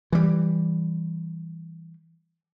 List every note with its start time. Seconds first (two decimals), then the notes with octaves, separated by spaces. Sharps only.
0.12 E3 G3